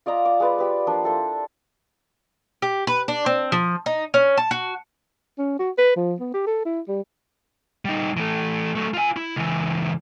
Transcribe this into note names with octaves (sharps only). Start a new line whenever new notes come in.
F4 D5 D#5 A#5
D6
G#3 B4 D5
G4 B4
F3 A#3 D4
E4 A4 C5
G4
B4
D4
C4
F3
D#4
C#4
A5
F#4
C#4
F#4
B4
F3
B3
G4
A4
E4
G3
G3 D#4
E3 A3
F#3 A3
F4 G#5
E4
C#2 E3